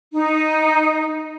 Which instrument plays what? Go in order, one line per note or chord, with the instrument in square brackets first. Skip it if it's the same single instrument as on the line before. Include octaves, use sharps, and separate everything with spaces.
[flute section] D#4